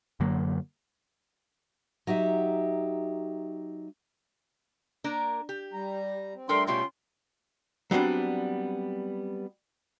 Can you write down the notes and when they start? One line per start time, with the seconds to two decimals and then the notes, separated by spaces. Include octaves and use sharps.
0.20 F#2 D3 F#3 A#3
2.07 F#3 D#4 G4 E5
5.04 A#3 D4 A#4
5.49 G4
5.73 G3 A#5
6.34 C4
6.49 G3 A3 D4 A4 A#4 G5 C6
6.67 B2 G3 A3 C#4 F4 G5 C6
7.91 F#3 G3 B3 C4 D4